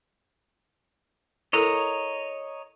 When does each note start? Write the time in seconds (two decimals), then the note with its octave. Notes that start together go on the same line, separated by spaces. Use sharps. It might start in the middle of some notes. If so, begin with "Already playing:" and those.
1.53 E4 A4 A#4 C#5 D#5 A#5